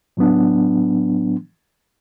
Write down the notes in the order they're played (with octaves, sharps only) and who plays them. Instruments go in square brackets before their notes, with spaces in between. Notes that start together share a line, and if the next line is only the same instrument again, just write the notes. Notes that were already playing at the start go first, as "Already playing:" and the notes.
[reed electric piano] A2 F#3 B3 D4